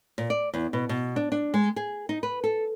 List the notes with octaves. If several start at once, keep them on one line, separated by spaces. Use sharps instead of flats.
A#2
D5
E2
B2
B2
D4
D4
G#3
G#4
D#4
B4
A4